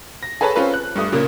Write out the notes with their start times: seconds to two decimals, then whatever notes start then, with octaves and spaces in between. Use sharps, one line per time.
0.23 A#6
0.41 G#4 A4 B4 C#5 A5 B5
0.56 C4 C#4 F4 A4 B4
0.74 F#6
0.96 G2 A3 D#6
1.12 A#2 C#3 A#3